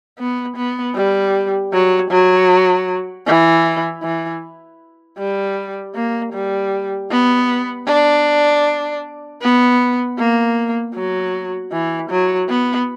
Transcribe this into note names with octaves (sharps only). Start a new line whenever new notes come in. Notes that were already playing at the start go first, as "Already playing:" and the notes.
B3
B3
G3
F#3
F#3
E3
E3
G3
A#3
G3
B3
D4
B3
A#3
F#3
E3
F#3
B3